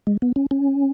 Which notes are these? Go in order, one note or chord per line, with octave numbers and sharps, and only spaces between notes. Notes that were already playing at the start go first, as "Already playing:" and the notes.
G#3
B3
C#4
C#4